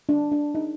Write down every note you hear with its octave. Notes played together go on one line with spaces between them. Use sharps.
D4
D4
D#4